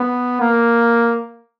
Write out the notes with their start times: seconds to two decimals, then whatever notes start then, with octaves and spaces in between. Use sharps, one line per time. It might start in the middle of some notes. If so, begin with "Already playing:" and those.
Already playing: B3
0.41 A#3